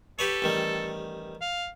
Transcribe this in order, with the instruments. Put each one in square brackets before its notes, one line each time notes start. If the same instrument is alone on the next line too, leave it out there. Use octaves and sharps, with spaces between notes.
[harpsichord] G4 B4 C#5 [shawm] A4
[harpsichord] A1 D#3 G3
[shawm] F5